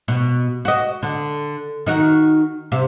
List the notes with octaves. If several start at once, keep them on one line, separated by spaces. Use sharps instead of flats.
B2
F#4 D#5
D3
D#3 D#4 F#4
C3